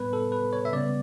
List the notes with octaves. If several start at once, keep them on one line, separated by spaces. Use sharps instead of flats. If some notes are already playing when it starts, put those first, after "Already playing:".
Already playing: A2 G3 B3 B4
A4
B4
C#5
E5
C#3 G3 B3 D5